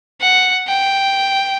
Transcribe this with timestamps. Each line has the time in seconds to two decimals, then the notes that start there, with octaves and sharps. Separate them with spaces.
0.21 F#5
0.67 G5